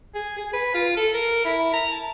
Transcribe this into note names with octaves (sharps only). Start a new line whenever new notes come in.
G#4
G#4
B4
F4
A4
A#4
E4
A#5
A5